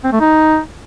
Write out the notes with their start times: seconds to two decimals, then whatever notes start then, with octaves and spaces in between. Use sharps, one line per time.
0.04 C4
0.12 A3
0.20 D#4